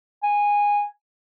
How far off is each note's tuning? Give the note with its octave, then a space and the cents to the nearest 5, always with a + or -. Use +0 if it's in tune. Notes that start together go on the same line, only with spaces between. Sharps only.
G#5 -15